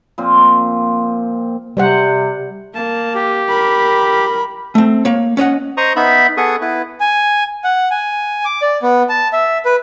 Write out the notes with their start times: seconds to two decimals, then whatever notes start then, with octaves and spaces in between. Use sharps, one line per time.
0.18 A#2 F3 C4
1.77 C3 G3 C5 F#5
2.75 A#3 A5
3.15 G4
3.49 A#4 B5
4.75 A3 C4
5.05 A#3 C#5
5.37 C#4 C#5 D#5 F#5
5.77 C5 D#5 A#5 C#6 D#6
5.96 B3 D#4 E5 B5
6.37 B3 G#4 A4 F#5 C#6 D#6
6.61 B3 E4 B4
7.00 G#5
7.64 F#5
7.91 G#5
8.45 D6
8.62 D5
8.82 B3
9.09 A5
9.33 E5
9.65 B4